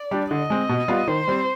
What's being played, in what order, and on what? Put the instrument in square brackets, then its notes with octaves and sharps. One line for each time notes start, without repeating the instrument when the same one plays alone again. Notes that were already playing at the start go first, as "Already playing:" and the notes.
Already playing: [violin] D5
[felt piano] G3 D4 G4
[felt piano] D3 [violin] D#5
[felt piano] G#3 C4
B2
G3 B3 F4
[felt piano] D#3 [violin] C5
[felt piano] G3 C4